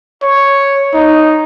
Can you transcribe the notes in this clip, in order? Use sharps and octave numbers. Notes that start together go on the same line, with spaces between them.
C#5
D#4